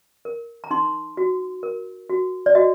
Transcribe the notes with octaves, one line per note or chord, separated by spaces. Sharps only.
A#4
A#5
D#4 C6
F#4
A#4
F#4
D5
F#4 D#5